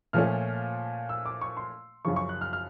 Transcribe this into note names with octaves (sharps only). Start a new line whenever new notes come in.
A#2 F3 A3 C#4 F6
E6
D6
C#6
C6
F#2 C#3 F3 C#6
C#6
F#6
F6
F6